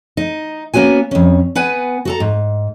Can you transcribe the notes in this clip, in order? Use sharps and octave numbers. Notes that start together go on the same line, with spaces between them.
D#4
A#3 B3 C#4 F#4 G#5
F2 C#4
B3 B4 F#5 G#5
F#4 A4 A#5
G#2